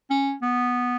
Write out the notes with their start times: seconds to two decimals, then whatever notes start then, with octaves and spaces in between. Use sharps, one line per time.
0.10 C#4
0.42 B3